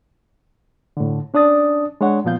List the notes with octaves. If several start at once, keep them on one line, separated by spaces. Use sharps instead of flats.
A2 D3
C#4 D4 D5 D#6 A6
G#3 D4 C#5 F#5
A#2 F3 B3 F4 F5 G6